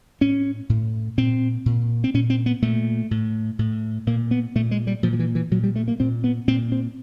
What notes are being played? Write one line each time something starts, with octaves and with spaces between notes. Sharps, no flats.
A2 C#4
A2
A#2 C4
A#2
C4
A#2 C#4
C4
B3
A#2 A3
A2
A2
A#2 A#3
B3
A#2 A3
G#3
G3
A#2 F3
F3
E3
E3
A#2 F#3
G3
A3
A#3
A#2 C4
B3
A#2 C4
C4